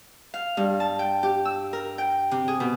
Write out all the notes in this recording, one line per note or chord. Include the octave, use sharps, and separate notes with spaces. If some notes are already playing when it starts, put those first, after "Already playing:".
F5
G2
A5
G5
G4
E6
A#4
G5
C3
G#4
B2